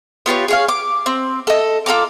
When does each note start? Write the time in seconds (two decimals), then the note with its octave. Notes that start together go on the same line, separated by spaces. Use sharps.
0.26 B3 F4 G4 C#5
0.48 G#4 C#5 F5
0.68 D6
1.06 C4
1.47 A4 D#5
1.86 F4 A4 A#5 D6